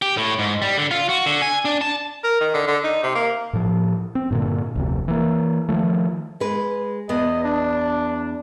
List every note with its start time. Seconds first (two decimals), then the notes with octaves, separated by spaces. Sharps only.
0.02 G4
0.17 A2
0.39 G#2
0.62 G3
0.78 D3
0.91 F4
1.09 F#4
1.26 D3
1.42 G#5
1.65 D4
1.81 A5
2.24 A#4
2.41 D#3
2.54 D3
2.68 D3
2.84 D#4
3.03 C3
3.15 A#3
3.53 A2 F3
4.15 C4
4.30 G2 A#2 D3
4.76 F1 D2 C3
5.08 E3 A#3
5.69 D#3 F3 A3
6.40 G#3 B4
7.09 E2 B3 D#5
7.44 D4